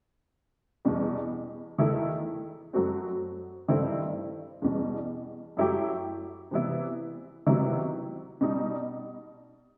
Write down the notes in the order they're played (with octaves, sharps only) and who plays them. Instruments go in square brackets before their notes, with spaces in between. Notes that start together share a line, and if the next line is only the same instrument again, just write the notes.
[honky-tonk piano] E2 B2 G3
E2 D#3 A3 E4
F#2 F#3 A3 C4 F#4
G2 D#3 A3 C4 E4
E2 B2 G3
F#2 F#3 A3 E4 G4
C3 E3 B3 E4
C3 D#3 F#3 B3 E4
B2 G3 D#4